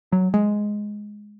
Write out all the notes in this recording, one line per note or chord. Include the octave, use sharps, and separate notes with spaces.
F#3
G#3